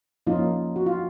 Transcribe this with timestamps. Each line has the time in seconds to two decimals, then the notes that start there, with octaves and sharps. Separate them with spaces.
0.27 F3 A#3 C#4 D#4 F4
0.76 F#4
0.86 F4